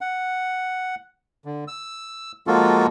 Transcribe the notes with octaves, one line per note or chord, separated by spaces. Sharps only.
F#5
D3
E6
F3 G#3 A#3 F4 F#4 A4